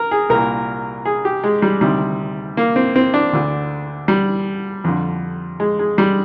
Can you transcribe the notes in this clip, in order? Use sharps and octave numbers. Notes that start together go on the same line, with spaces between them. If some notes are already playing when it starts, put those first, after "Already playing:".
Already playing: A#4
G#4
C2 A#2 A#4
G#4
G4
G#3
G3
D2 C3 D#3 G3
A#3
C4
C4
D4
D2 D3
G3
F2 D3
G#3
G#3
G3